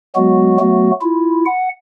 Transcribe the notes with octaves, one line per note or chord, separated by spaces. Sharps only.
F#3 G#3 B3 F#4
F#3 A3 B3 F#4
E4 F4
F#5